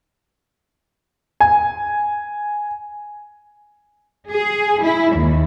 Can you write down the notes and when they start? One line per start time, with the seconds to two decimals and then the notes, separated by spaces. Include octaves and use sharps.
1.40 G#5
4.29 G#4
4.83 E4
5.16 D#2